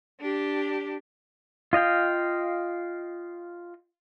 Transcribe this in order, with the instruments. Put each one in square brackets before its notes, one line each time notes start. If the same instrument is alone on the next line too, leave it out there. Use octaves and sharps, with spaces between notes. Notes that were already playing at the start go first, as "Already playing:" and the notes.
[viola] D4 G4
[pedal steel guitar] F4 D#5 F5 G5